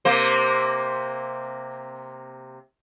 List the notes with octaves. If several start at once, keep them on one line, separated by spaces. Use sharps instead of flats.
C3 A#3 C5